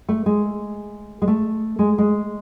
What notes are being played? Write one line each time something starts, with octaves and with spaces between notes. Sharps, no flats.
A3
G#3
G#3
A3
G#3
G#3